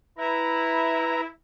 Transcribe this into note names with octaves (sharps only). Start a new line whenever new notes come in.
E4 B4 A#5